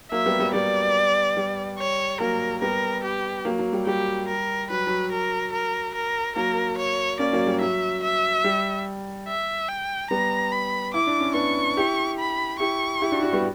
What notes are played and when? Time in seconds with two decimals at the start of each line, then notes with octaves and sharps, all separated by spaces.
0.11 F#3 A#3 E5
0.26 G3 B3
0.40 G3 B3
0.54 G3 B3 D5
1.37 G3
1.79 C#5
2.20 F#3 A#3 A#4
2.61 G3 B3 A#4
3.04 G4
3.45 F#3 A#3
3.59 F#3
3.73 G3
3.86 G3 G4
4.28 A#4
4.70 F#3 B4
4.87 F#3
5.12 A#4
5.52 A#4
5.95 A#4
6.36 F#3 A#3 A#4
6.78 C#5
7.19 A#3 C#4 D5
7.33 F#3 A#3
7.47 G3
7.61 F#3 E5
8.03 E5
8.44 G3
9.28 E5
9.68 G5
10.11 G3 B3 A#5
10.52 B5
10.94 E4 D6
11.07 D4
11.21 C#4
11.34 B3 D4 C#6
11.77 E4 G4
12.19 B5
12.60 E4 G4 C#6
13.02 E4 G4
13.12 D4 F#4
13.22 D4 F#4
13.33 G3 B3